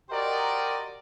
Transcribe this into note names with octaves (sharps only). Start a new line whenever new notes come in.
F#4 G4 A#4 C5 D5 D#5